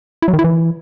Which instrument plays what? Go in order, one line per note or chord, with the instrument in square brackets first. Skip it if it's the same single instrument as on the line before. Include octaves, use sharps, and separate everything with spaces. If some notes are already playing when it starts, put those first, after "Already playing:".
[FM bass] E4
F#3
D#3
E4
E3